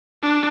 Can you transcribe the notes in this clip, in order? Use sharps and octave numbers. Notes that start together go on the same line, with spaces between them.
D4